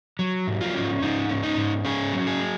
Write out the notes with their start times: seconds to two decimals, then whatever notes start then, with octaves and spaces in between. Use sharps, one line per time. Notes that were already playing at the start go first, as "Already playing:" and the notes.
0.19 F#3
0.47 G#2
0.61 F4
0.75 C#4
1.02 G#2 D#4
1.29 C#4
1.43 D#4
1.57 G#2
1.84 C#4 G#4
2.13 F#3
2.27 G#4